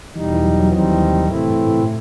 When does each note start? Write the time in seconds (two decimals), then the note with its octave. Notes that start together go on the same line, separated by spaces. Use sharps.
0.15 E2 B2 E3 G3 D#4
0.34 E3
0.44 F#3
0.60 F#3
0.71 D#2 D#3 E3 G3 C4 D#4
0.90 E3
1.09 C3
1.27 A2 C3 E3 A3 C4 E4
1.47 G2
1.66 A2
1.84 A2